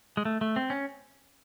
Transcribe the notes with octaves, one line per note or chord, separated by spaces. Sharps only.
G#3
A3
A3
C4
C#4